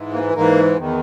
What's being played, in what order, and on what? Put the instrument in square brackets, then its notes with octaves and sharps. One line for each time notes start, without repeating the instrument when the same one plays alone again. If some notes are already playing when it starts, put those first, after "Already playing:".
Already playing: [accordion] G#2 E3
A#3
G#2 E3 A#3
E2 D#3